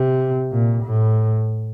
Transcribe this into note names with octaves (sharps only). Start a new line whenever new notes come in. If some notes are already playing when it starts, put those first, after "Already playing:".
Already playing: C3
A#2
A2